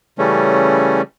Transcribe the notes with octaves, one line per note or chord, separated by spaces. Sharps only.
C#3 E3 G3 A3 C#4